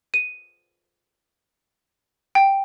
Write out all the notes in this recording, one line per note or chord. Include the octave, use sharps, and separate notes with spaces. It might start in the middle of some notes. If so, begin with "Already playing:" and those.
D#7
G5